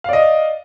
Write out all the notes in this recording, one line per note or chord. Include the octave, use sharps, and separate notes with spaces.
D5 D#5 F5